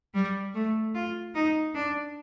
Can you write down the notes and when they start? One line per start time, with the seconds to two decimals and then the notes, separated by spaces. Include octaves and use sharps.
0.14 G3
0.54 A3
0.94 F4
1.35 D#4
1.75 D4